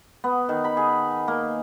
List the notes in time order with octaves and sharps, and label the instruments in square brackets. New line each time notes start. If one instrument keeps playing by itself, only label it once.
[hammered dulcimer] B3
D#3
B5
G#4
A#3